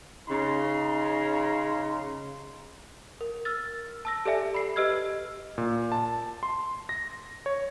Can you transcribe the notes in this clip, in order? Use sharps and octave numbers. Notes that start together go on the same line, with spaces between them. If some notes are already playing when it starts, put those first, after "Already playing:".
C#3 D#4 A#5 C6
A#4
E6 F6 A6
A5 E6 A#6
G4 A4 D5 E5 G#5
B5 C7
G4 B4 D#5 E6 F6 G#6
A#2
A5
C6
A#6
C#5